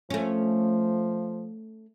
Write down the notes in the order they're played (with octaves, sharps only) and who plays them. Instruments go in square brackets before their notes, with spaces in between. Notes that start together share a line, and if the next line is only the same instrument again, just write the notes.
[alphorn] F3 [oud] A3 C#4